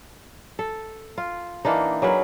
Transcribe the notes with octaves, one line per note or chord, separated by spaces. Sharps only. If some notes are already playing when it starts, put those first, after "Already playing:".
A4
F4
E3 A#3 D4 D#4
F#3 G#4 A#4 B4